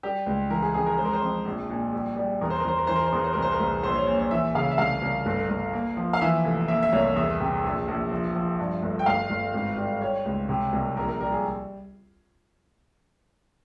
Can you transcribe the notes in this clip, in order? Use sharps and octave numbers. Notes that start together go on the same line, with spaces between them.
G3 G4
C#2
E3 A#4
G#4
F2 G#4
A#4
G#3 C5
A#4
C5
F2
A#1
A#2
G3
G3
E2 A#4
C5
A#4
E2 C5
A#4
E3 C5
A#4
C5
E2 A#4
C5
C2 A#4
C5
A#4
C2
A#1 C5
C#5
A#2 C#5
C#5
E3 E5
C#3 F5
E5
C2 F5
C2
G1
G1
A#3
F3
F5
E3 E5
F1
A#3 E5
E5
C2 C#5
E2 E5
C3
A#1
A#1
F3
F3
G2
G1
G5
G1 F5
G1
G#1
G3
G3 C#5
C#2
C3
C2
A#1 A#4
A#4
G3 A#4
G#4